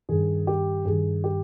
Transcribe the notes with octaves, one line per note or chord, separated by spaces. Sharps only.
G2 D#3 G#4
G4
G2 D#3 G#4
G4